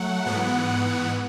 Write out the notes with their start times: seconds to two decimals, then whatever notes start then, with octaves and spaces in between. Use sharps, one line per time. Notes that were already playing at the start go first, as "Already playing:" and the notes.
Already playing: F#3 A3 F#5
0.26 G#2 E3 B3
0.69 F#5